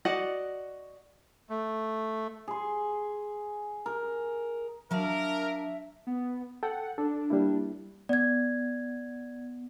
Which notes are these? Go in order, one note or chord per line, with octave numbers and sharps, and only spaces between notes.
F#4 D5 D#5 F#5
A3
G#4 C6
A#4
F#3 D4 A#4 E5 F5 A5
B3
A4 F#5 G5
D4 A4
G3 A#3 E4
B3 D5 G#6